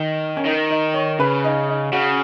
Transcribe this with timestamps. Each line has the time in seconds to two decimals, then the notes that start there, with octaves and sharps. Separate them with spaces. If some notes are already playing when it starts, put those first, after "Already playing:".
Already playing: D#3
0.37 C#4
0.45 D#3 D#4
0.70 D#4
0.94 C#5
1.19 C#3 B4
1.44 D#4
1.69 D#4
1.92 C#3 F#4